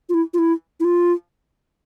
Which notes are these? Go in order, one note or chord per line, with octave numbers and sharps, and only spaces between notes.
F4
E4
F4
E4
E4
F4